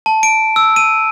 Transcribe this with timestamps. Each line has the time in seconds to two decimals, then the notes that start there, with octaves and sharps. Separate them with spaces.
0.06 A5
0.23 D7
0.56 E6
0.76 D#7